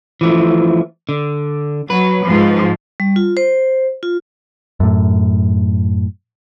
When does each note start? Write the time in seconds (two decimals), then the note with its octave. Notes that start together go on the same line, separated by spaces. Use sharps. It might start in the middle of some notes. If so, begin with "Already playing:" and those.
0.21 E3 F3 A3
1.09 D3
1.90 F#3 B4
2.26 G#2 F3
3.00 G3
3.16 F4
3.37 C5
4.03 F4
4.80 F#2 A2